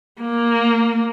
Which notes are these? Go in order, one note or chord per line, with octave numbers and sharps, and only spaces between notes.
A#3